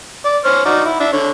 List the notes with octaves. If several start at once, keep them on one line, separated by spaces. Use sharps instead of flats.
D5
C5 C#5 F6
D#4 F#4 D5
E4
D4 E5
D3 C#5